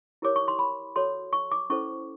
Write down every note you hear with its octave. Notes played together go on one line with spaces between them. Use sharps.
E4 G4 A#4 C#5 D6
C#6
C6
B5
F#4 A4 C#5 C6
C#6
D6
C#4 E4 A4 C5 C#6